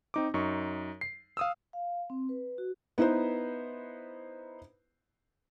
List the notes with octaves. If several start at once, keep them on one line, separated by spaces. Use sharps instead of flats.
C4 D#4 D6
F#2 D#4 C#6
C7
F5 D#6 E6
F5
C4
B4
F#4
B3 D#4 E4 B4 C5